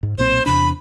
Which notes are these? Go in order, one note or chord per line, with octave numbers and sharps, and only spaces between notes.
G#2
B1 A#2 C4 C5
E2 C3 D4 B5